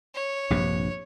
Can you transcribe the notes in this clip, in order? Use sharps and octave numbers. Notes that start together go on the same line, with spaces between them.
C#5
A#1 G2 C3